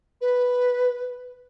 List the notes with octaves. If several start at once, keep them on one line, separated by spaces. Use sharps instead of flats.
B4